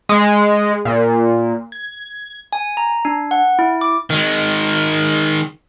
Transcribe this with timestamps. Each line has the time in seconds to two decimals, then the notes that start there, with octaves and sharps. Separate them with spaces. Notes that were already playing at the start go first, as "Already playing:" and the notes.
0.09 G#3
0.85 A#2
1.72 G#6
2.53 G#5
2.77 A#5
3.05 D4
3.31 F#5
3.59 E4
3.81 D6
4.10 D#3 G#3